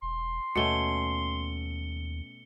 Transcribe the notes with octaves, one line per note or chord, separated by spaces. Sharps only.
E1 C6
D#2 B2 A3 C#4 C#7 G7